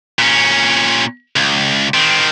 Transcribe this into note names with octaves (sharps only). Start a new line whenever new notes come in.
A#2 C#4
C#2
D#3 C4